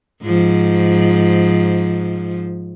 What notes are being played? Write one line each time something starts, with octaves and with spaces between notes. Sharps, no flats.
G#2 F3